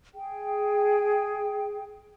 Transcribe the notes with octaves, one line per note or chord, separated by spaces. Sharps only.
G#4 G5